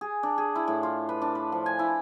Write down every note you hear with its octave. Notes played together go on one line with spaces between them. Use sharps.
G#4
D4
G#4
E4
A2
F4
B4
D4
B4
F3
G#5
E4